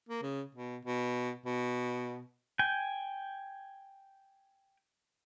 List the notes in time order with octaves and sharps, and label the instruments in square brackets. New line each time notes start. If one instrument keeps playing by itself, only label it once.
[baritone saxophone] A#3
C#3
B2
B2
B2
[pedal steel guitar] G5 G#5